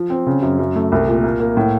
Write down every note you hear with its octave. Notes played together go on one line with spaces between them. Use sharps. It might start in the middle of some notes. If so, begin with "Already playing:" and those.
Already playing: F3
C4
C#3
F#2
F#2
A3
C2
A#2
A#3
A#3
A2